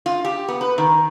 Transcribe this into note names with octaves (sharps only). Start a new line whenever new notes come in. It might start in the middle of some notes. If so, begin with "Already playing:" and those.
F4
G4
B3
B4
D#3